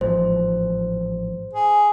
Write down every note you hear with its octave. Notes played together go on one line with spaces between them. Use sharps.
A1 G#2 F3 C5
G#4